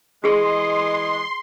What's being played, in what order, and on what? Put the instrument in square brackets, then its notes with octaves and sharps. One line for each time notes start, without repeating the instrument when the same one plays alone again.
[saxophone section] E3 G#3 D#5 [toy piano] G4 G#4 [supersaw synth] C6